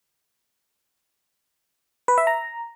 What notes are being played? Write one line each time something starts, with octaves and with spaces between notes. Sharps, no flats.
B4
E5
A#5